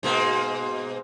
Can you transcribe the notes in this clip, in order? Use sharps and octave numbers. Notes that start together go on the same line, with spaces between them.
G#2 B2 A#3